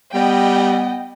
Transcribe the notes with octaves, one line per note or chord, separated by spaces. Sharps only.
G3 B3 D#5 G5